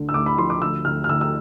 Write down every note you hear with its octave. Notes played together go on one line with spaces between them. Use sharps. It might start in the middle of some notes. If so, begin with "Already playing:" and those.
Already playing: D2 D3
E6
D2 D6
B5
F3 C6
D6
D2 E6
D2 F6
F6
D2 E6
E6